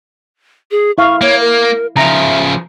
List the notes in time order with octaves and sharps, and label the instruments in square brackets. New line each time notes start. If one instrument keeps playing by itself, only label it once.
[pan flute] G#4
[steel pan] E4 F5 [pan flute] C#6
[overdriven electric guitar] A#3 [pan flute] C#5
[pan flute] A#4
[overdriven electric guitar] C#3 F3 [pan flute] E5 [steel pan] A#5